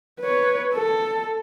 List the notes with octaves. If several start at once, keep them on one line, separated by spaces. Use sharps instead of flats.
B4 C#5
A4